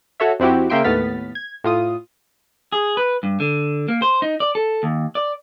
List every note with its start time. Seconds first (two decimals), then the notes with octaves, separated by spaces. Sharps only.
0.20 F#4 A4 C#5 E5
0.40 F2 C4 E4 F#4 G4
0.70 C#3 A#3 E5 G5 C6 D7
0.84 D#2 A2 B3 F6 A6 B6
1.35 G#6
1.64 A2 F4 D#6
2.72 G#4
2.97 B4
3.23 G2
3.40 D3
3.88 A#3
4.02 C5
4.22 D#4
4.40 D5
4.55 A4
4.83 D#2
5.15 D5